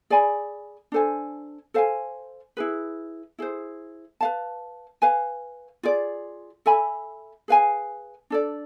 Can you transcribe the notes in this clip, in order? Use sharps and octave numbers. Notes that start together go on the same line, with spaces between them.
G#4 D5 G#5 B5
D4 A4 C5 G#5
A4 C5 F5 G#5
E4 G#4 B4
E4 G#4 C5
B4 F5 A5
B4 F5 G#5
F4 G#4 D5
A4 E5 G#5 B5
G#4 B4 F5 G#5
D4 A4 D5